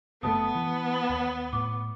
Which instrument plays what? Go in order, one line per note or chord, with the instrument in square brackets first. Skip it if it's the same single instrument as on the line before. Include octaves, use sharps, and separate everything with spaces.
[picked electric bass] F#1 A#2 A3 [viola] B3 [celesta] A5 D#6
[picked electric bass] E3
D#2
[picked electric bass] A2 [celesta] D6